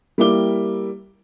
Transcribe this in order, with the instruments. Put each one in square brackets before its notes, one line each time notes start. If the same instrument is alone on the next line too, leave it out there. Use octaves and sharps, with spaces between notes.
[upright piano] G3 A#3 E4 D6 G7